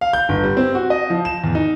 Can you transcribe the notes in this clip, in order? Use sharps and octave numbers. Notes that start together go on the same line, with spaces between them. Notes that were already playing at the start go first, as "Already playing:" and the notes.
F5
G6
G1
G3
C4
F#4
D#5
F3
E7
E2
D#4